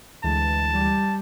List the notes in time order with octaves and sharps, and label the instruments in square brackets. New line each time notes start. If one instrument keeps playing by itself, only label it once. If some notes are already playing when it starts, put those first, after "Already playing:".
[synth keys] D2 E3 G#3 [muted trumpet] A5
[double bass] G3